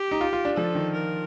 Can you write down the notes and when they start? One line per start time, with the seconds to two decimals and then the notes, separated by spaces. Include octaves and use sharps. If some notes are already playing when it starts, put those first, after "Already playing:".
Already playing: G4
0.11 D#4
0.21 F4
0.33 F4
0.45 D4
0.57 F3 A4
0.75 D#3
0.93 A#4